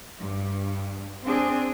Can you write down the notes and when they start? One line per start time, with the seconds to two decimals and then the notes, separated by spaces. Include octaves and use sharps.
0.18 G2
1.24 C4 D4 G#4